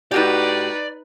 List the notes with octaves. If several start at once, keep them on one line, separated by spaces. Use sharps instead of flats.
A2 D#4 F#4 G4 B4 D5